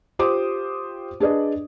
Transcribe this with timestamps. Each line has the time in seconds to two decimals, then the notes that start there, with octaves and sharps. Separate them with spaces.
0.19 F4 G4 C5 D6 D#6
1.20 D4 G#4 B4 D5 D#5